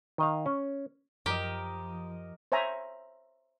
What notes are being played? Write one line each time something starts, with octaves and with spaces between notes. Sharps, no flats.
D#3 D#5 F5
C#4
F#2 F3 G4 A#4 D#5
C5 C#5 E5 G#5 A#5